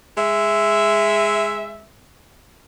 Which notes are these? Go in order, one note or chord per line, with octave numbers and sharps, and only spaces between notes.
G#3 E5